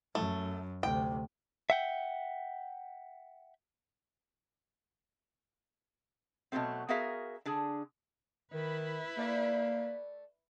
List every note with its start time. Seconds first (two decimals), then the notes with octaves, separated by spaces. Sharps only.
0.15 F#2 A3
0.83 D2 C3 G5
1.70 E5 F#5 G5
6.52 B2 D#3 F#3 A3 C4
6.89 B3 F#4 G#4 A#4 E5 F5
7.45 D3 D4 G#4
8.53 D#3 E4 B4
9.17 A3 A#3 D5